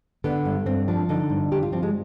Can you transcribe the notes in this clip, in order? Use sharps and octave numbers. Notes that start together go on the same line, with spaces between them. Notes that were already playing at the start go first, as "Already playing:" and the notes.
D3 B3
G2
G2 C4
F3 D4
D3 D#4
G2
G2 G4
F4
F3 C4
G#3